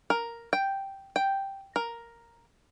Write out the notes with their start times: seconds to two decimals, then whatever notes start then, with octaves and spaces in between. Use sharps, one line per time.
0.10 A#4
0.53 G5
1.16 G5
1.76 A#4